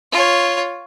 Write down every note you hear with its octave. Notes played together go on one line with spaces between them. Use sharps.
F4 C#5